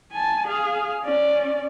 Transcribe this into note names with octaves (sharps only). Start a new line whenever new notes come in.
G#5 A5
G#4 F5
C#4 D5